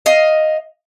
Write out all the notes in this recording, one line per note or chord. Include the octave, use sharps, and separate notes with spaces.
D#5 F5